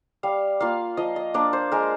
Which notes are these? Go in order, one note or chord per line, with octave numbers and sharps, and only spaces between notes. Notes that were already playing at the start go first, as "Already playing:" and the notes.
G3 F5
A#3 F4 F5
F3 D#5
D#5
A#3 D4 D5
C5
G#3 A#4